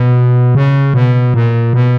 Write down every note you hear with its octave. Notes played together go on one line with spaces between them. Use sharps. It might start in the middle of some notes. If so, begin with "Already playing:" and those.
Already playing: B2
C#3
B2
A#2
B2